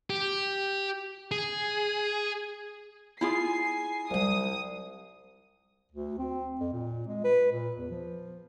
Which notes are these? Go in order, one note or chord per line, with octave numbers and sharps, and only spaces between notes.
G4
G#4
E4 F4 G#4 G#5 C7
C2 F#3 G3 D#6
D2
C4
F2
A#2
G#3
B4
A#2
E2
F3